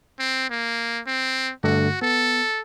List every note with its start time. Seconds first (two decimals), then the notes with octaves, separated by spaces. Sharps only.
0.19 C4
0.50 A#3
1.07 C4
1.64 G2 D3 A3 F#4
2.02 B3 A4